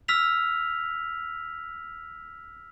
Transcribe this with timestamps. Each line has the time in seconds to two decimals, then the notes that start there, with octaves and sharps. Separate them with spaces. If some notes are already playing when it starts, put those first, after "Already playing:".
0.08 E6 F6 B6 F7